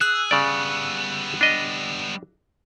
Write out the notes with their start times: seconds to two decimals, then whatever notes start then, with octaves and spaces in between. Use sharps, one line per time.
0.01 G#4 E6 F#6
0.31 C#3 G3 B3 D5
1.41 D4 D#5